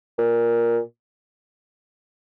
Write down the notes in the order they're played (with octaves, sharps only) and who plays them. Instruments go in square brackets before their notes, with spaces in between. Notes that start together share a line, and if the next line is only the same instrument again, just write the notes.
[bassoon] A#2